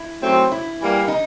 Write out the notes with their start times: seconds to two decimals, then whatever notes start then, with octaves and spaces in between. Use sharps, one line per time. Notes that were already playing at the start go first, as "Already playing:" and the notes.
Already playing: E4
0.23 D#3 F#3 A3 C4
0.52 E4
0.80 E3 G3 A#3
1.08 D#4